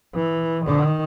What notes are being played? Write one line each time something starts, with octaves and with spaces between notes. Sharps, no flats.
E3
D#3